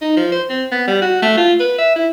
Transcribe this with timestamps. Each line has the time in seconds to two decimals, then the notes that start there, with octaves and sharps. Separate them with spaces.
0.01 D#4
0.17 F3
0.32 C5
0.49 C4
0.72 B3
0.87 G3
1.02 F#4
1.22 A3
1.37 F4
1.60 B4
1.78 E5
1.96 E4